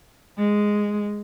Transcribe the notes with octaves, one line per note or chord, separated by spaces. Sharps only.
G#3